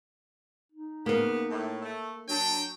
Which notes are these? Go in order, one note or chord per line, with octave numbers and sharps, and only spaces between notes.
D#4
C#3 A#3 B3 A#4
A2
A3
F#3 D4 G5